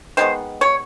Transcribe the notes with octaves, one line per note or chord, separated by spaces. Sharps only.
D#3 G#3 B3 C5
C#5